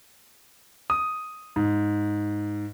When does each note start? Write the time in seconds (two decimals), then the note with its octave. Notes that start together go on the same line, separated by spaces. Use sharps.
0.90 D#6
1.56 G#2